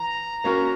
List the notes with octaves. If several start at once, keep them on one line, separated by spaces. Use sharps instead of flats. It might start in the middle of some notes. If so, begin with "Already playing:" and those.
Already playing: E3 A#5
A#3 C#4 F#4 A#4